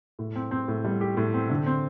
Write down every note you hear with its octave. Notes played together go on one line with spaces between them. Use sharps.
A2
C4
C4
A2
G3
G4
A2
C4
D3
C4